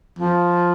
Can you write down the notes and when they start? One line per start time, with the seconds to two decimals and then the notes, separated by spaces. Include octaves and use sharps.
0.19 F3